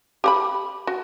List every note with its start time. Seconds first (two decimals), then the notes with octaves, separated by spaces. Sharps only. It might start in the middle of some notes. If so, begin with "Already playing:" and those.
0.24 G4 F#5 B5
0.87 F#4